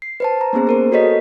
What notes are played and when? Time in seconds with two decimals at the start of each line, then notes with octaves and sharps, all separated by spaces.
0.02 C7
0.20 B4 C5 A5
0.41 A#5
0.53 A#3 B3 C#4 G#4 C5
0.67 G#4 A#4 C5
0.92 F#4 A4 B4 C#5 D#5 B6